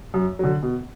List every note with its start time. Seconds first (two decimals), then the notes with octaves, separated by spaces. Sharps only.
0.14 F#2
0.39 D3 F#3
0.63 B2